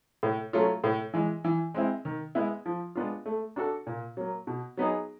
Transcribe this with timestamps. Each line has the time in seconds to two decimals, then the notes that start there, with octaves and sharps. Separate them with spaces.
0.23 A2
0.53 F#3 A3 C#4 F4
0.84 A2
1.14 E3 G#3
1.44 E3
1.74 G#3 C4 E4
2.05 D#3
2.35 G#3 B3 E4
2.66 F3
2.96 G#3 B3 D4 F4
3.26 A3
3.56 D4 F#4 A4
3.87 A#2
4.17 F#3 A#3
4.47 B2
4.77 F#3 B3 D#4 G#4